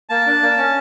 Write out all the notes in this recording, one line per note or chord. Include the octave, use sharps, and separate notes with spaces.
A#3 A5
D4
A#3
C#4